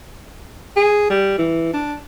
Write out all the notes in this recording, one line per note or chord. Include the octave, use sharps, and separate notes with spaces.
G#4
G3
E3
D4